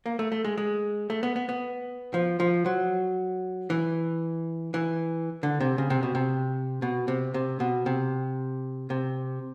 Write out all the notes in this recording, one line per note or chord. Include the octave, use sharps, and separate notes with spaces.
A#3
A3
A3
G#3
G#3
A3
B3
B3
B3
F3
F3
F#3
E3
E3
D3
C3
C#3
C3
B2
C3
B2
C3
C3
B2
C3
C3